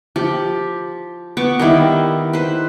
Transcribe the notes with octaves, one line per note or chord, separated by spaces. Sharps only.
F3 G4
B3 C#6 D6
D#3 G3 E4
B4 C5